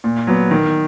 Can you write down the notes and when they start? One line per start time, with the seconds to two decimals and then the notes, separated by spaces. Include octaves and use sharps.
0.04 A#2
0.27 F#3 B3
0.51 D#3